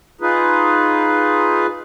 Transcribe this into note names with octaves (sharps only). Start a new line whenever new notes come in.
D#4 F4 G#4 B4